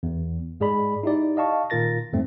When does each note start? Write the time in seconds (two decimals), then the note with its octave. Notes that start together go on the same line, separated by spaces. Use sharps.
0.03 E2
0.60 G#2 G#3 G#4 D5 B5
1.03 D#4 E4 G4 D5
1.37 D#5 F5 A5 C#6
1.70 A#2 D#3 F4 A#4 A6 A#6
2.13 E2 G#2 G3 A3 C4